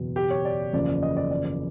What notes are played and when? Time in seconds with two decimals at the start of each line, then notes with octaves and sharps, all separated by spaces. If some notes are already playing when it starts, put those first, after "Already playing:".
Already playing: F#1 E2 B2
0.16 G4
0.31 C#5
0.45 D5
0.73 F#1 E2 C#3 F3 D5
1.03 D#5
1.17 D5
1.31 D5
1.45 D5